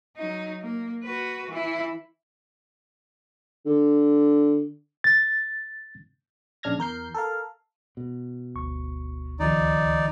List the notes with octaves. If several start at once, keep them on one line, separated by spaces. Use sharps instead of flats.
F#3 D#4
A#3
F#4 B4
E3 E4
D3
A6
A#1 C#3 D4 F6 G#6 A#6
E2 A#4 G6 C7
A4 A#4 F5
B2
G1 D2 C#6
C#2 D#3 F3 D#4 D5